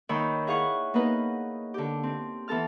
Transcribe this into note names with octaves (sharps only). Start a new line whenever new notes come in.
D#2 D#3 C#5 G5 B5 E6
E4 G#4 F5 F#5 C#6
A#3 B3 D#4 B4 D#5
D3 G4
C4
E3 B3 A4 A5 F6